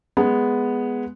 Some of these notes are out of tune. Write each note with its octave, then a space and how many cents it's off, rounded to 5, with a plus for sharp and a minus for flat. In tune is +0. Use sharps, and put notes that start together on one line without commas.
G#3 +0 B3 +0